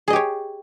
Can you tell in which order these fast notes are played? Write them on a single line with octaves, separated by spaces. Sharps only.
G#4 D#5 G4 C#5